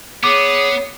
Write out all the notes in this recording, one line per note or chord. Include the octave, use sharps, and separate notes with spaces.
B3 G#4 C#5 D6